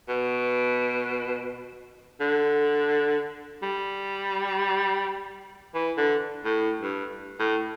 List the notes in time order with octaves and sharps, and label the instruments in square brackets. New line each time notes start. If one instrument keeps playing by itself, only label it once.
[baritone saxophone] B2
D3
G3
E3
D3
A2
G2
A2